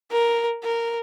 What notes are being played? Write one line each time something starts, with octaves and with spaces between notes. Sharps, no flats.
A#4
A#4